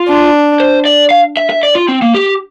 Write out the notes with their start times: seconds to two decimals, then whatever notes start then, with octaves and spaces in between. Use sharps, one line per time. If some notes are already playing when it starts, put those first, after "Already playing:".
Already playing: F4
0.08 D4
0.60 C5
0.85 D5
1.11 F5
1.37 E5
1.50 E5
1.63 D5
1.75 F4
1.88 C4
2.02 A#3
2.15 G4